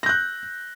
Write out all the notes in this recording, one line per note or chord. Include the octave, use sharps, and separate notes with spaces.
F#6 G6 A#6